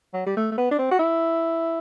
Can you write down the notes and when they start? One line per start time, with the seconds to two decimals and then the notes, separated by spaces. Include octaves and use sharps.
0.14 F#3
0.26 G3
0.37 A3
0.52 A3
0.57 B3
0.71 D4
0.79 C4
0.91 F#4
0.99 E4